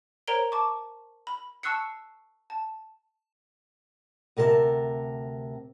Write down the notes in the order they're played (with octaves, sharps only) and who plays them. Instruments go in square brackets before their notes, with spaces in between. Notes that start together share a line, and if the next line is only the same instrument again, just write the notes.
[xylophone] A#4 C5 C#5 A#5 D7 G7
A5 C#6 D6
B5
A5 C#6 E6 F#6 C7 C#7
A5
[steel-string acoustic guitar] D2 C3 A#4 B4 A5